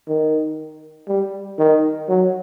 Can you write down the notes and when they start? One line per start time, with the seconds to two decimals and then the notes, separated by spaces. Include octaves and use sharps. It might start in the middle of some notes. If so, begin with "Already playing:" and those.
0.08 D#3
1.08 G3
1.58 D#3
2.09 F#3